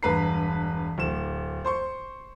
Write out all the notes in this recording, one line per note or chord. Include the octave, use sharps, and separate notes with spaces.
E1 G2 B4 A#5 C7
D1 E7
C5 C6 C#6